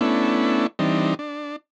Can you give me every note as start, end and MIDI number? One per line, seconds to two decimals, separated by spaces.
0.01 0.67 57
0.01 0.67 59
0.01 0.67 61
0.01 0.67 62
0.01 0.67 64
0.79 1.14 52
0.79 1.14 55
0.79 1.14 60
0.79 1.14 62
0.79 1.14 63
1.19 1.56 62